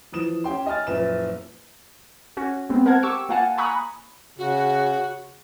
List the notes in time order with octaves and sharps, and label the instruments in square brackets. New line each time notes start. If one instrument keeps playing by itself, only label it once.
[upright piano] E3 F3 D#6 E7
C#4 G4 G5 C6
D#5 G#5 F6 A6
F#1 A#2 F3 B4 E5 E7
[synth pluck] C#4 F#4
G#3 B3 C4
A#4 C5 F#5 A5 G#6
G4 C#6 D6 E6 C#7
A#3 F4 F5 F#5 G#5 A5
G#5 A#5 B5 C#6 D#6 F#6
[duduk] C#3 [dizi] F#4